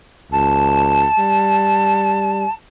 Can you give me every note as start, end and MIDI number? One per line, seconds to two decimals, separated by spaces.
0.32 1.07 37
0.32 2.53 81
1.19 2.45 55